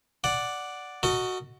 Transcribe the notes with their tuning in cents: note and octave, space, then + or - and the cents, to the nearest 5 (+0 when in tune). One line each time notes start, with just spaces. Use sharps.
D5 +0 F#5 +0
F#4 +0 A4 +45 D#5 +0